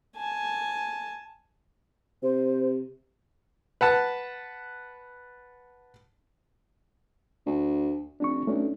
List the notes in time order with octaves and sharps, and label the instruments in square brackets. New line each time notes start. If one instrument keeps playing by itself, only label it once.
[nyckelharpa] G#5 A5
[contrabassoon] C3 [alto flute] C5
[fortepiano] B4 F#5 A5
[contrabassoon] D2
[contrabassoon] F1 [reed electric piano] D4 C#6
[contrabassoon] B1 [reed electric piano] A3 C#4 D4